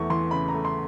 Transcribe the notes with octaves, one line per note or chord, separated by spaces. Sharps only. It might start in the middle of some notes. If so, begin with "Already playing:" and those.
Already playing: E2 A3 C#6
E3 C6
C#3 B5
A#5
A3
C6